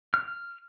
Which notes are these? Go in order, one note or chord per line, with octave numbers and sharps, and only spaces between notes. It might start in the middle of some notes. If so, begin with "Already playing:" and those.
F6